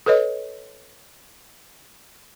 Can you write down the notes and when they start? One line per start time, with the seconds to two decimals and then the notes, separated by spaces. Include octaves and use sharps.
0.06 A4 B4 C#5 D#5